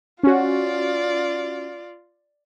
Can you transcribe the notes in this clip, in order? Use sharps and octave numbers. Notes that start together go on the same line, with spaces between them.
C#4 F4 F#4 D5